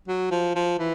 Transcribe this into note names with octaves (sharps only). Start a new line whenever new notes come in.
F#3
F3
F3
E3